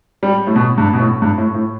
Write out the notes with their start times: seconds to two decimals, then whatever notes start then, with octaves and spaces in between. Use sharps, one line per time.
0.23 G3
0.47 A2
0.56 B2
0.78 G2
0.93 B2
0.99 A2
1.22 G2
1.38 A2
1.55 A2